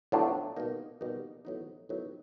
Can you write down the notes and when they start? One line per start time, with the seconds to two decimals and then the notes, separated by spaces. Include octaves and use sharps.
0.12 A2 F#3 B3 D4 F4
0.56 B2 G3 A#3 D#4
1.01 B2 G3 A#3 D#4
1.45 A2 F#3 B3 D#4
1.89 A2 F#3 B3 D#4